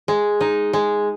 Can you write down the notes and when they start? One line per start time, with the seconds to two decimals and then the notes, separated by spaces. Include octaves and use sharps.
0.08 G#3
0.41 D#4
0.73 G#3